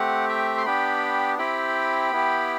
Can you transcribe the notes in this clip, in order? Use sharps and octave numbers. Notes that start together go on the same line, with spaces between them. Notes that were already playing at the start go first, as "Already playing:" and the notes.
Already playing: A3 C4 G4 F#5
E5 G5
C6
B3 D4 G4 G5 B5
C4 E4 G4 G5 B5
B3 E4 G4